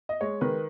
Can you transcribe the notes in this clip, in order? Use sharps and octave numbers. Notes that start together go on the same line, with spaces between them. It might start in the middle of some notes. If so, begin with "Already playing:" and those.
D#5
G#3 C#5
D#3 B4